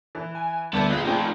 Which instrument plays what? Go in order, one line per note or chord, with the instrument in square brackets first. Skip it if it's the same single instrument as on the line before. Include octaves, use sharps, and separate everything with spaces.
[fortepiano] E3
[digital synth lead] G#5
[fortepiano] D2 A4 B4 [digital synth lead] G3 [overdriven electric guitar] B3 [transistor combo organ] D5 E5 A5
[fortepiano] A#1 [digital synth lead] F4 [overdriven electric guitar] G#4 D#5 [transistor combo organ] F5 B5 D#6
[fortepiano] F3 B3 C4 [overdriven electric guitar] A3 D#4 [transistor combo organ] G#4 D5